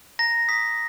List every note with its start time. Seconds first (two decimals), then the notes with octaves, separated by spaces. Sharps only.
0.19 A#5 A#6
0.48 D#6 B6